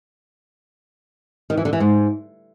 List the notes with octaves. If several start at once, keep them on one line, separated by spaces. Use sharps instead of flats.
D#3
E3
D3
E3
G#2